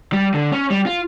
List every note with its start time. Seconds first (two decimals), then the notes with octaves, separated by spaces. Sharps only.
0.13 G3
0.34 D3
0.52 C#4
0.70 G3
0.86 F4